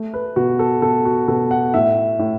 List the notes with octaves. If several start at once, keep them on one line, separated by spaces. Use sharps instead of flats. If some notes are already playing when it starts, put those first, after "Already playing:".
Already playing: A3
B4
B2 F#4
A4
B2 A4
F#4
B2 A4
F#5
A2 E5
A2